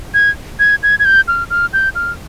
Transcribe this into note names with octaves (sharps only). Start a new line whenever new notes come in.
G#6
G#6
G#6
G#6
G6
F6
F6
G6
F6